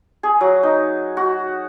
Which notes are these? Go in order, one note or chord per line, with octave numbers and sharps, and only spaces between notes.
G#4
F#3
D#4
F#4